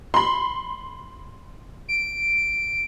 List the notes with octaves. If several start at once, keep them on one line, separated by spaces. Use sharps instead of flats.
B5 C6
D7